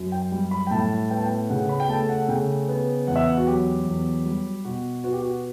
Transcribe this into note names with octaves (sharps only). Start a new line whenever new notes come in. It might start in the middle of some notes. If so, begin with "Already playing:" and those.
Already playing: F#2
G5
G3
B5
G5
A2 A5
B3 G5
A5
G5
C#3 F#5
B5
G5
A3 A5
F#5
C#3 G5
B3
E2 F#5
E5
F#5
F#4
F#3 G4
E2
G3
B2 F#4
B3 F#4
G4
F#4